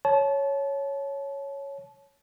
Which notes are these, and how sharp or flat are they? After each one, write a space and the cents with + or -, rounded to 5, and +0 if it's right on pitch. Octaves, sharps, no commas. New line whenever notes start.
C#5 +0 A5 -25